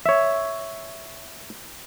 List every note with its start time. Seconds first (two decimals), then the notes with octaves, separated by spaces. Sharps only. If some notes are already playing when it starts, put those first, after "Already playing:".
0.06 C#5 E5